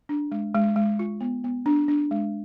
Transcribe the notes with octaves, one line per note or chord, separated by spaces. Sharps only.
D4
G#3
G#3
G#3
F4
B3
B3
D4
D4
G#3